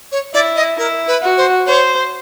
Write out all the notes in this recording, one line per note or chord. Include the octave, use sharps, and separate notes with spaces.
C#5
E4 D5
D#5
E4 A#4
B4
F#4
C5
C5 C#5